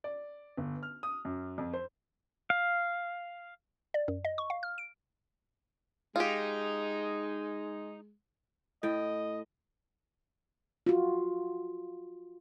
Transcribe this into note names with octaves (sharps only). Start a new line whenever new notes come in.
D5
G1
F6
D#6
F#2
F2
C5
F5
D5
F#2
D#5
C#6
F5
F6
D7
G#3 D#4 F4 G4
A2 D#5 G5
F4 F#4